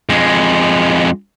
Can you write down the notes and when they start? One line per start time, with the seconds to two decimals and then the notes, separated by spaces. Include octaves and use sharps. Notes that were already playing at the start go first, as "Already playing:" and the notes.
0.09 F2 G#3